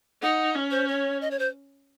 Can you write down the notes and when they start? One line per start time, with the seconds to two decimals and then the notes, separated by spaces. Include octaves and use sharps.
0.22 D#4 F#5
0.55 C#4
0.71 C5
0.88 C#5
1.21 D#5
1.31 C#5
1.39 C5